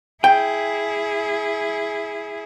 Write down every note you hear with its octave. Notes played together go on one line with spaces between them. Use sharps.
E4 G#4 G5